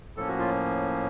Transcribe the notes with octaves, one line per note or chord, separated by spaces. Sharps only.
A2 F3 A#3 C#4 A4
F#4
F4